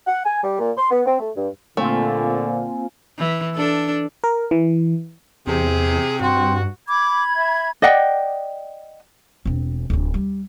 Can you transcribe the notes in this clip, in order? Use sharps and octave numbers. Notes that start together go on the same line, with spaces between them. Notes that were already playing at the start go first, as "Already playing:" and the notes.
F#5
G#5
G3
A#2
C6
B3
C4
A3
G2
A#2 D3 A3 A#3 C4 F4 F5 G#5
E3
D4 A4
A#4
E3
E2 C3 G#4
G2 C4 F#4
B5 D6 G#6
E5
D5 D#5 F#5 G5
E1 C4
D1 D3
G3